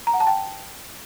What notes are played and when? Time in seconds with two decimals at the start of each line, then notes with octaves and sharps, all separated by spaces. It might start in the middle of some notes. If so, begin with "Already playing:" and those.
0.07 A#5
0.14 F#5
0.20 A5
0.27 G5